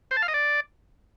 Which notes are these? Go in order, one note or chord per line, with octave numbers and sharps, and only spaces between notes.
C5
A5
F5
D#5
D5